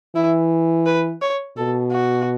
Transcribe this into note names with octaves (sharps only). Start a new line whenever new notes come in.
E3 E4
B4
C#5
B2 A4
F#4